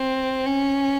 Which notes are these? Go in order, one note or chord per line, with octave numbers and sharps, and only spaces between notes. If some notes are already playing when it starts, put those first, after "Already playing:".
Already playing: C4
C#4